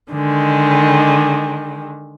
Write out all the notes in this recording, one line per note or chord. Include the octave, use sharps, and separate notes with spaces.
D3 D#3 G#3